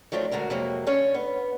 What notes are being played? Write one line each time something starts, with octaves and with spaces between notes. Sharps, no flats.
F3 F#3 A3 C4 D4
D2 D3 G#3 F#4 A#4
F2 C3 F#3 G#3 A#3
D3 C#4 C#5
B3